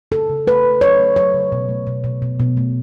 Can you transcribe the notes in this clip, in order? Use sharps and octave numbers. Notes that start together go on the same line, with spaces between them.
C#3 A4
C#3
A3 B4
A3
F#3 C#5
A3
F#3 C#5
C#3
B2
A3
B2
B2
B2
B2
A3